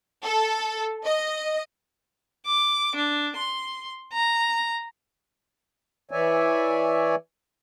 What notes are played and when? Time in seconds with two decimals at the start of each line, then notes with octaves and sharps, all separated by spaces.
0.24 A4
1.05 D#5
2.46 D6
2.96 D4
3.37 C6
4.13 A#5
6.11 E3 C#5 D5 E5 G#5